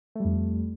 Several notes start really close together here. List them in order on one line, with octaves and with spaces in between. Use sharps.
A3 G3 F2